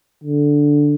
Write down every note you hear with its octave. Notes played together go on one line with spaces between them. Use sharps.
D3